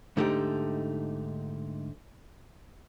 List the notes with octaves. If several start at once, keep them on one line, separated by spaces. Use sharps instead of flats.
G#2 D3 A3 D#4 G4